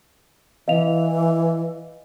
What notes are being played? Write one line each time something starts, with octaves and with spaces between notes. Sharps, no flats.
E3 D#5 F5 F7